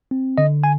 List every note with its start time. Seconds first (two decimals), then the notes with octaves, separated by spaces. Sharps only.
0.11 C4
0.38 D3 D#5
0.64 G#5